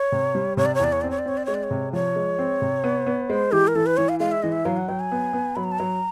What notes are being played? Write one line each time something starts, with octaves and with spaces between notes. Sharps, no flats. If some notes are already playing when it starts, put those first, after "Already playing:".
Already playing: C#5
C3
G3
C3 C#5
D5
C#5
E2 D5
C#5
C4 D5
C#5
D5
C4 C#5
D5
G#3 C#5
D5
C#5
C3
F3 C#5
G#3
C4
C3
B3
B3
G#3 C5
E3 G4
A#4
E3 A4
B4
E3 C#5
F5
G#3 F5
E5
E3 D#5
E5
F#3 F5
F#5
F#3 G5
G#5
B3
B3
F#3 B5
A#5
A5
F#3 A#5